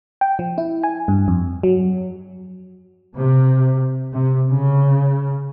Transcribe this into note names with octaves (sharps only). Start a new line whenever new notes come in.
G5
F3
E4
G#5
G2
F2
F#3
C3
C3
C#3